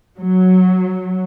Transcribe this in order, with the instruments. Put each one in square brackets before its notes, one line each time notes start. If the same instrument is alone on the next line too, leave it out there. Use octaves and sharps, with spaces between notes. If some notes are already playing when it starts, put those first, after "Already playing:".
[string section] F#3